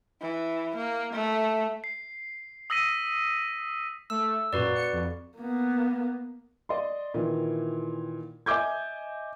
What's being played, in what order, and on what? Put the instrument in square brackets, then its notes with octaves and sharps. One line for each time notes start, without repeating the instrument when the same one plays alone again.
[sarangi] E3
A#3
A3
[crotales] C7
D#6 E6 A#6 B6 D#7
[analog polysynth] A3 [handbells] E6
[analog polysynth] F#2 A#2 [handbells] F#4 B4 D5
[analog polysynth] C#7
F2
[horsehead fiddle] A#3 B3
[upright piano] D5 D#5 C6
A#2 D#3 E3
D#5 E5 G#5 D6 G6 G#6